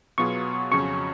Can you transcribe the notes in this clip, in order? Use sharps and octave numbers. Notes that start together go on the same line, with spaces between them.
B2 F#3 B3 F4 G#4 C#6
F2 C#3 F#3 C#4 F#4 C#6